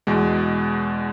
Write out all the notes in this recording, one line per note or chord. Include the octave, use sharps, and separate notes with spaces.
E2 B2 G#3